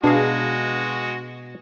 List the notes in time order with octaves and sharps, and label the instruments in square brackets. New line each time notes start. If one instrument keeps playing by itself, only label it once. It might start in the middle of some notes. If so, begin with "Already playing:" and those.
[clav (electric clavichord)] B2 B4 G#5 [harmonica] G#3 F#4 [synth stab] D4 G#4 F5